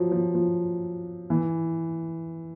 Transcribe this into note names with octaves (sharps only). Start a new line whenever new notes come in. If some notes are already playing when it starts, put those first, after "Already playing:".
Already playing: F3 F#3
F3
F3
E3